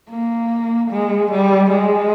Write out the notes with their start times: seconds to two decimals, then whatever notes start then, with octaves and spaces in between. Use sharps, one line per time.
0.11 A#3
0.91 G#3
1.31 G3
1.71 G#3